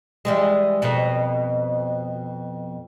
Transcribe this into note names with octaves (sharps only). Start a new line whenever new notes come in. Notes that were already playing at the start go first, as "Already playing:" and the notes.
E3 G3 G#3
F2 B2